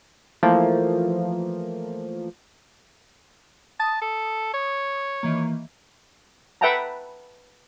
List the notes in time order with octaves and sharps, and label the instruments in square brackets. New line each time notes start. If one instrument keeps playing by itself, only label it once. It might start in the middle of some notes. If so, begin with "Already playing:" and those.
[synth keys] E3 F3 A3 A#3
[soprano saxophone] A5 [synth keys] D#6
[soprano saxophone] A4
C#5
[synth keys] D#3 E3 A#3
[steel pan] B4 E5 F#5 G5 A5 A#5